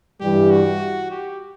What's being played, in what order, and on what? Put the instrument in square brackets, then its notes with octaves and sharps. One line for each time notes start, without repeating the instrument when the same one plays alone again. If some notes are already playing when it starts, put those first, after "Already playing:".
[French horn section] G2 E3 G3 [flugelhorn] G4
[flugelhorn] F#4
G4